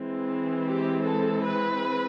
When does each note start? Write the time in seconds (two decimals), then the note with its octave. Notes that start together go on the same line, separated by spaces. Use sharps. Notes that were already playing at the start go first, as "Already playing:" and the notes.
Already playing: E3 G#3 C4
0.66 G4
1.04 A4
1.44 B4